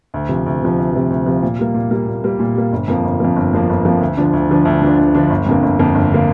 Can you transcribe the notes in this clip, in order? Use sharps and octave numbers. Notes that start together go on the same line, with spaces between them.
D2
C3 F3
D2
C3 F3
D2
C3 F3
D2
C3 F3
A#2
G3 A#3
A#2
G3 A#3
A#2
G3 A#3
A#2
G3 A#3
G1
F2 F3 A#3
G1
F2 F3 A#3
G1
F2 F3 A#3
G1
F2 F3 A#3
D2
D3 F3 D4
D2
D3 F3 D4
D2
D3 F3 D4
D2
D3 F3 D4
G1
F2 D3 A#3
G1
F2 D3 A#3
G1
D3 A#3